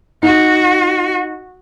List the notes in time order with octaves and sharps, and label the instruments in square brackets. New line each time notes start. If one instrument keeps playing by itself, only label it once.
[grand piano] D#4 [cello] F#4